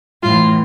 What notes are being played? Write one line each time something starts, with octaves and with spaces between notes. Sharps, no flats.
A2 E3 F4